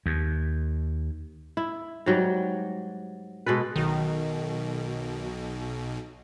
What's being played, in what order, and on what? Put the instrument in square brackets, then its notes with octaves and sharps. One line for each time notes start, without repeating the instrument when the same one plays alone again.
[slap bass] D#2
[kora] E4
G#2 F#3 G3
B2 G#3 A4 B4
[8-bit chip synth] B1 B2 [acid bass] D#3